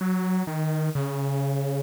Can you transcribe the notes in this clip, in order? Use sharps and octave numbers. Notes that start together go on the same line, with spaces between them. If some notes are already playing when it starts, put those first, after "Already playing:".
F#3
D#3
C#3